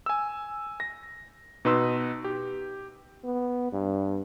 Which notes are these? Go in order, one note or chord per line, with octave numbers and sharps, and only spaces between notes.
G#5 E6
A#6
B2 D#4 B4 C6 E6
G4
B3
G2